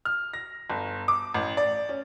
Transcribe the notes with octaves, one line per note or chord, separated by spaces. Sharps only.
F6
A#6
G1
D6
A1
D5
C#4